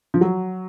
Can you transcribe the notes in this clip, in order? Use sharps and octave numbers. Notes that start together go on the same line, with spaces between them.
F3
F#3